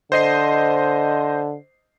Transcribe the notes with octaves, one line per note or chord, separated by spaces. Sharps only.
D3 C5 D#5 C7